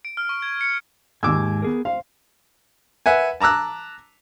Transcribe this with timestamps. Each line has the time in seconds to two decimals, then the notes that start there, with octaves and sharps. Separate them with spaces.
0.05 D7
0.17 F6
0.29 C#6
0.42 G#6
0.61 C#7
1.23 D#2 G#2 G#5 D6 E6
1.62 B3 G#4 A#4
1.85 C5 F5
3.06 B4 E5 F#5 G#5
3.41 A5 A#5 D6 E6 F#6